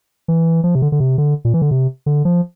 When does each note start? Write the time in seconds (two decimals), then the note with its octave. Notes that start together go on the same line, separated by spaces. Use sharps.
0.28 E3
0.64 F3
0.75 C3
0.82 D3
0.92 D3
1.00 C3
1.18 D3
1.45 A#2
1.54 E3
1.62 D3
1.71 C3
2.06 D3
2.25 F3